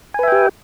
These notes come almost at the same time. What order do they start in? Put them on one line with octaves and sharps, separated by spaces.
G#5 B4 E5 G5 G4